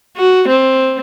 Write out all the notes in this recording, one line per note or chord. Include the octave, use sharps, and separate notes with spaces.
F#4
C4